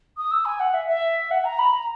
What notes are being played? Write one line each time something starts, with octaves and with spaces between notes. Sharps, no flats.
D#6
E6
G#5
F#5
E5
E5
F#5
A#5
B5
A#5